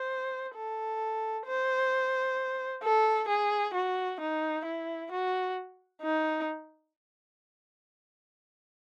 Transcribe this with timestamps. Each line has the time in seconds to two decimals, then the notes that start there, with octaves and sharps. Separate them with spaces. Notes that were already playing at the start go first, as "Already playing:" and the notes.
Already playing: C5
0.55 A4
1.46 C5
2.83 A4
3.28 G#4
3.74 F#4
4.20 D#4
4.65 E4
5.11 F#4
6.02 D#4